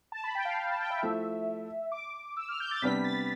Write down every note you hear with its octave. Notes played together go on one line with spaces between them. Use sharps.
A5
B5
G5
F5
F5
A5
G5
E5
F3 A3 E4
D6
E6
F6
G6
A6
C3 G3 B3 D4 B6
A6